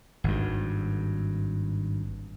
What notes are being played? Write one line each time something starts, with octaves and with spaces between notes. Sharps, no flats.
G#1 G2